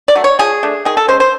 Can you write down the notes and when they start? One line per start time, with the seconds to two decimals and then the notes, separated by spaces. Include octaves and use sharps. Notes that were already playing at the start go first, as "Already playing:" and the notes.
0.08 D5
0.15 F#3 A3
0.24 C#5
0.39 F3 G#4
0.63 A3 D4
0.85 D#3 G#4
0.97 A4
1.08 G#3 C#4 C5
1.20 C5